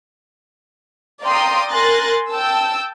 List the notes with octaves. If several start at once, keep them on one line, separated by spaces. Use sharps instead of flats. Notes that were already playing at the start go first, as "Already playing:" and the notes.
D5 F5 G5 A#5 C6 D#6
A#4 G#5 C6 F#6 A6 A#6
G5 A5 E6